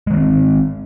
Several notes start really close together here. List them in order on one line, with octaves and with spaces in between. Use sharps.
G#3 D#3 A#3 C4